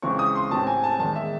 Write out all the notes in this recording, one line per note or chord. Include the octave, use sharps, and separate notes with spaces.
C#2 C#3 E3 C4 C#6
D#6
C6
A1 A2 E3 C4 A5
G#5
A5
E2 D#3 G#3 A5
E5